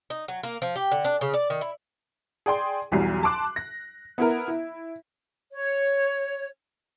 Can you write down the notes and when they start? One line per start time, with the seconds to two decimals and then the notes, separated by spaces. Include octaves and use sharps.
0.10 D#4
0.28 F#3
0.43 A#3
0.62 F3
0.76 G4
0.91 D3
1.05 D4
1.21 C#3
1.34 D5
1.50 D#3
1.61 E4
2.46 G#4 D5 G5 C6
2.92 B1 E2 F#3 G3 C7
3.23 A5 C6 D6 F#6
3.56 A#6
4.18 B3 E4 A#4
4.48 E4
5.52 C#5